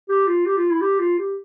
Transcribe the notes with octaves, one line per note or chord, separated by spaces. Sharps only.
G4
F4
G4
F4
E4
G4
F4
G4